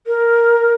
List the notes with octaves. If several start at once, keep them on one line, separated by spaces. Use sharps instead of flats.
A#4